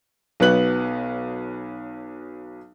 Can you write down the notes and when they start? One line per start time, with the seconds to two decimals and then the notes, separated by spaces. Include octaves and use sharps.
0.40 B1 F#3 B3 B4 F#6 F#7